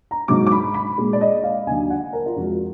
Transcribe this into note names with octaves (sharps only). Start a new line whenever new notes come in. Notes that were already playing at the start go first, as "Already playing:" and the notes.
A#5
G#2 F#3 D6
D6
B5
B5
A#2 G#3
D5
D#5
F5
D#2 D3 F#3 G#5
F#5
A#4
F4
F2 F3 G#3 F#4